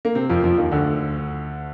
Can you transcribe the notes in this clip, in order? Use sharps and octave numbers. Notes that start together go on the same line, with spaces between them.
A#3
C3 C4
F2 F3
F2 F3
D#2 D#3
D2 D3